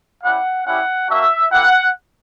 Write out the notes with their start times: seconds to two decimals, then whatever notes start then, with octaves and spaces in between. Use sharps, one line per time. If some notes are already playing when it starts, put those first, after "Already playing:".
0.23 G3 C#4 E4 F#5
0.65 G3 C#4 E4 G4 F#5
1.08 A#3 D4 F#4 E5
1.51 A#3 E4 G4 F#5